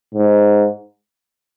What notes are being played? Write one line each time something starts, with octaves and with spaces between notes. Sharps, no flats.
G#2